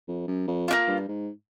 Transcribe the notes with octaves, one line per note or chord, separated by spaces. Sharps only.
F2
F#2
F2
A#3 D4 F4
G2
G#2